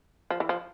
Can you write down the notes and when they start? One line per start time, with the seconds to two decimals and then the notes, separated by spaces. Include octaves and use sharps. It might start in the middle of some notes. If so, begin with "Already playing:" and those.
0.31 F3
0.40 E3
0.49 F3